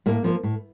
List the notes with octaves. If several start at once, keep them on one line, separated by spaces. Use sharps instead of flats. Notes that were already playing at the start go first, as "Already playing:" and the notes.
A2 A#3
F3 A#3
A2